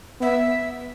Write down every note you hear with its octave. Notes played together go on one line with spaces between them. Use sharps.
B3 E5